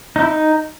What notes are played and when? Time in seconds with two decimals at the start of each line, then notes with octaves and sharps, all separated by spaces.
0.16 D#4
0.21 E4
0.27 D#4